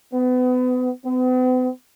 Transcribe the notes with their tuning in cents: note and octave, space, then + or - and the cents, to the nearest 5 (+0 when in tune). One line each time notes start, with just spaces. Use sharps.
B3 +30
B3 +45